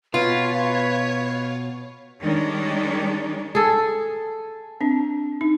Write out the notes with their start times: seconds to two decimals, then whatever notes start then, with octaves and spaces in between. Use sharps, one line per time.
0.14 B2 F4 B4 C#5
2.21 D#3 G3 G#3 C#4 D4
3.55 G#4 A4
4.81 C4 D4
5.41 D#4